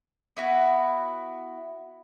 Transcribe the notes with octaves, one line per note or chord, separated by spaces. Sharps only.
B3 E4 F#4